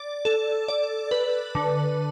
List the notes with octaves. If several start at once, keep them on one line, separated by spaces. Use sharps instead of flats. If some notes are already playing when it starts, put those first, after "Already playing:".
Already playing: D5
A4
D5
B4
D3